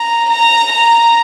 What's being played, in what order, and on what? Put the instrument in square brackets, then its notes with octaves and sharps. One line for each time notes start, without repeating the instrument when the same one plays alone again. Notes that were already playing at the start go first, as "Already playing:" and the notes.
Already playing: [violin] A#5
A#5
A#5